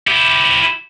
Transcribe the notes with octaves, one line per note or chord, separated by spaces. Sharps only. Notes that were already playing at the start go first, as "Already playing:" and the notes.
E4 G4